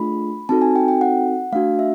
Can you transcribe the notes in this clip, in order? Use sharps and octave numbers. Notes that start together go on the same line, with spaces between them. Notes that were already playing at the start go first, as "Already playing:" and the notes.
Already playing: A3 D4 F4 G#4 B5
C4 D#4 F#4 A4 A5
G#5
G5
G5
F#5
A3 D4 F#4 F5
E5